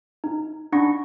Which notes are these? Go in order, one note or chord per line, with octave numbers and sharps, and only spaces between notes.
D#4
D4 D#4 F#5 B5 C#6 A#6